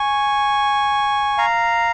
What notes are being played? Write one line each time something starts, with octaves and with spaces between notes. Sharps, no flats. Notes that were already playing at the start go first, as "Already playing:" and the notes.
Already playing: G#5 C#6
F5 A#5